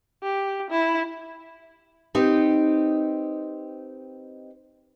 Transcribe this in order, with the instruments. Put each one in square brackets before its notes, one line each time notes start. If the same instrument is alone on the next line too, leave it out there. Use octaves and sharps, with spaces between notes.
[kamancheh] G4
E4
[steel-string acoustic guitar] C4 D#4 G4 B4